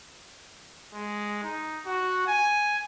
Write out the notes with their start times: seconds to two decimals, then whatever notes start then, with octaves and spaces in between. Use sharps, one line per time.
0.94 G#3
1.43 D#4
1.86 F#4
2.27 G#5